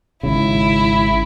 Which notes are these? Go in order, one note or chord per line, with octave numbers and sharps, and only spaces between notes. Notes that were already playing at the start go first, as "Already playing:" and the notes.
G#1 G#2 C#3 E4